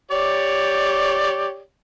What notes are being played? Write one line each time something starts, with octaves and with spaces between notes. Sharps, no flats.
G4 C#5 D5